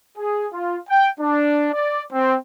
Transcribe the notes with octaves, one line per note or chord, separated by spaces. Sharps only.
G#4
F4
G5
D4
D5
C4